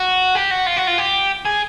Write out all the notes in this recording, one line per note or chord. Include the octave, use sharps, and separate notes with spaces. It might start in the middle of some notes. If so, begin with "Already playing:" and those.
Already playing: F#4
G4
F#4
F4
F#4
F4
G4
G#4